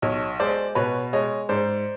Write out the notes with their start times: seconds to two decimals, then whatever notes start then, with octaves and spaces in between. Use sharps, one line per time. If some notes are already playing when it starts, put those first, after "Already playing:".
0.02 B1 C#5 D#5
0.40 G#3 C5 D5
0.75 B2 B4 C#5
1.13 G#3 C#5 D#5
1.49 G#2 C5 D5